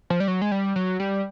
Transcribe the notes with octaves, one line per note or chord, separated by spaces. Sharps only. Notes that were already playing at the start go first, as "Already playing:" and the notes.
F3
G3
F#3
G#3
G3
F#3
G3